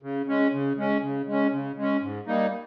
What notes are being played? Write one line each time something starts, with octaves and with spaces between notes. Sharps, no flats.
C#3
G#3 C#4
C#3
G#3 C#4
C#3
G#3 C#4
C#3
G#3 C#4
G#2
G3 A#3 D#4